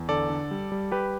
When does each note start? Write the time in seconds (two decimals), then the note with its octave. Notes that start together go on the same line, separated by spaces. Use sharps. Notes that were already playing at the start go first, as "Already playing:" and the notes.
Already playing: E2
0.09 D3 A4 D5
0.30 D3
0.51 G3
0.72 G3
0.92 G3 G4 B4